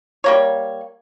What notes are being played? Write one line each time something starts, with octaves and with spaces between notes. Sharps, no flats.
G3 A#3 C#5